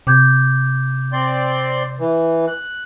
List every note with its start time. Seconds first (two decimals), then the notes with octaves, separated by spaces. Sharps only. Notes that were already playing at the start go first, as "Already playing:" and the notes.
0.07 C3 D6 G6 G#6
1.13 C4 D5 C6
1.99 E3
2.48 F#6